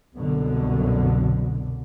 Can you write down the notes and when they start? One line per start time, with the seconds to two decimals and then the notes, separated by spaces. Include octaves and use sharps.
0.15 C2 F#2 B2 D3